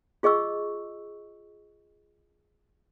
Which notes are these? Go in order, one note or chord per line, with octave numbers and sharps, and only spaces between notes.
F4 G#4 D#5 C#6 E6